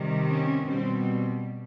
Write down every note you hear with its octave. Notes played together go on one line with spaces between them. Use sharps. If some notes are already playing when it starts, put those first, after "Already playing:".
Already playing: C3 D#3 G3
C#4
B2 G3 C4